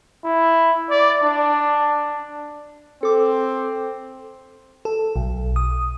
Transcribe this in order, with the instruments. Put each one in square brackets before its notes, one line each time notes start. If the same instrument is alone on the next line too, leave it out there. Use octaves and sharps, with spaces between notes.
[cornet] E4
D5
D4
[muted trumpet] C4 [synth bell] A4 D6
[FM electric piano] A4
B1
D#6